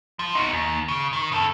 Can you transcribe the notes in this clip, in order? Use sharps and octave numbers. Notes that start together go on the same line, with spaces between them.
F3
D#4 F#4
D#2
C#3
D#3
C#3 A4